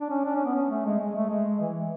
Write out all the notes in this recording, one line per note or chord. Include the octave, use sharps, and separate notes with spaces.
D4
C#4
D4
C#4
B3
C#4
A3
G#3
G#3
A3
G#3
E3